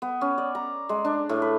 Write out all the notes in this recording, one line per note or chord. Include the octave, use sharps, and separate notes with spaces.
B3
C#4
D5
A#5
G#3
D4
A2
B4